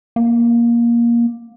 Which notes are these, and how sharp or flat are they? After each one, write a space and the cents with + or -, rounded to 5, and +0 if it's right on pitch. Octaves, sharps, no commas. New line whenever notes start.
A#3 +15